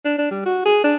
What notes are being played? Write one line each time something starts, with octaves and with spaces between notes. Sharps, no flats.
D4
D4
G3
F#4
G#4
D4